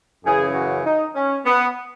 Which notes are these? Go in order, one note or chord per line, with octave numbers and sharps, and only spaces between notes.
F#2 C#3 E3 G#4
F#4
D#4
C#4
B3